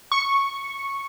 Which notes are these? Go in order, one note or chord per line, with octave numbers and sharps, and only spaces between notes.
C#6